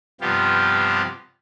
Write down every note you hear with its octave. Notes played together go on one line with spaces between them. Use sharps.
G2 C3 F3 B3 F4 G4